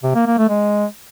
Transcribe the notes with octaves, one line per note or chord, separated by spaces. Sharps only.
C3
A#3
A#3
A3
G#3